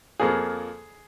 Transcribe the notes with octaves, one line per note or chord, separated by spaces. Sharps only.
F2 F3 A#3 G#4